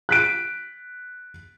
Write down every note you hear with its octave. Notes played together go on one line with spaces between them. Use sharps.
F#6 B6 D7